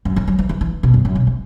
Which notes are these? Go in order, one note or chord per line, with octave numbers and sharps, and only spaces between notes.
F#2
E3
F#3
E3
E3
E3
B2
F#2
F#2
B2
E3